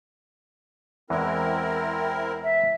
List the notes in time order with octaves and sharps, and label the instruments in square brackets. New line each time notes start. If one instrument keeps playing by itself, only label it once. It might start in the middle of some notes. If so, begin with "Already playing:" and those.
[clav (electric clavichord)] E2 E3 G#3 [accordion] C4 E4 A#4
[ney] E5